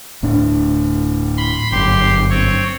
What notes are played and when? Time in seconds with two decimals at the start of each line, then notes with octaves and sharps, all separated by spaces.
0.23 D1 A2 D4
1.37 B5 C6
1.72 G1 F#2 G4 C6
2.30 C4 C#5